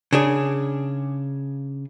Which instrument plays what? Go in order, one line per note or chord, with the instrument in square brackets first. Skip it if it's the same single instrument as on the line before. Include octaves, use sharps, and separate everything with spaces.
[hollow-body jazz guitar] C#3 D4 G#4